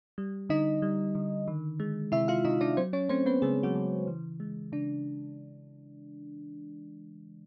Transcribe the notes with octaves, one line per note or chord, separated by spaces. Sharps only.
G3
D3 D#4 D#5
G3
D3
D#3
G#3
C3 E4 E5
F4 F5
C3 D#4 D#5
D4 D5
F#3 C4 C5
C#4 C#5
A3 C4 C5
B3 B4
C#3 G#3 G#4
F#3 F#4
C#3
E3
G#3
C#3 D4